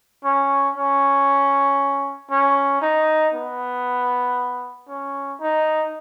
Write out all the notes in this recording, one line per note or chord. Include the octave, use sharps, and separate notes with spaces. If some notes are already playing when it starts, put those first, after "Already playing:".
C#4
C#4
C#4
D#4
B3
C#4
D#4